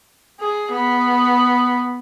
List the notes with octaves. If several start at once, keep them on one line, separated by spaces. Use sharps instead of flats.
G#4
B3